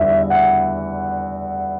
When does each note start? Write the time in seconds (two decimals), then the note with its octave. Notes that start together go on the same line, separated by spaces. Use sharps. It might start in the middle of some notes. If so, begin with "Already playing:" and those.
Already playing: E2 D3 G3 E5
0.23 E5
0.30 F#5